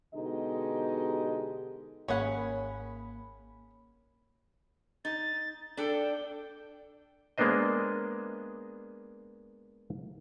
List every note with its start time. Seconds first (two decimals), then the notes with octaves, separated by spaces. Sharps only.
0.15 B2 D3 G#3 D#4 G4 D#5
2.08 G#1 A#3 C#4 G#4 F#5 B5
5.05 D#4 A6
5.77 D4 A4 G5
7.38 G#3 A#3 B3 D4 C5 D#5